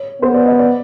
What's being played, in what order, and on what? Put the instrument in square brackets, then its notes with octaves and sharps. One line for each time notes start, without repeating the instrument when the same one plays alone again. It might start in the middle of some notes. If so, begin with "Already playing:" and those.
Already playing: [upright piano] C#5
[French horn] B3 [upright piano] C5
[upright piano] D5
D#5
D5